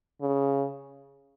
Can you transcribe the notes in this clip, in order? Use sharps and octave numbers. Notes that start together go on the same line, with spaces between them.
C#3